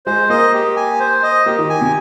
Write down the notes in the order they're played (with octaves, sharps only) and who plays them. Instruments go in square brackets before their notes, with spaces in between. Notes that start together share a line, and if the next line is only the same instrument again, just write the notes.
[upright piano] G#3 [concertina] C5
[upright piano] A#3 [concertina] D#5
[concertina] G4
G#5
C5
D#5
[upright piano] A#3 [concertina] G4
[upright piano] D#3
[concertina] G#5
[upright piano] C3